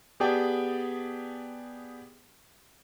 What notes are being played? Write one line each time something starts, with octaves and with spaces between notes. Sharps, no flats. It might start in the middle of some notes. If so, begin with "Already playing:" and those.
B3 G4 G#4 D5 G5 A5